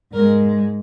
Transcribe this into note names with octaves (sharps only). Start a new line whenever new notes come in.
G#2 G#3 A#4